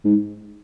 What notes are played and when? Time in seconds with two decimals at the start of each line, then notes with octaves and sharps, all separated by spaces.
0.05 G#2